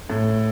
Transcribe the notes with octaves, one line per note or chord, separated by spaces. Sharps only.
A2